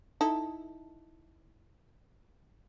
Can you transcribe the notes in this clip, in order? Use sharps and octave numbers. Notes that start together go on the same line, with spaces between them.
D#4 E4 A4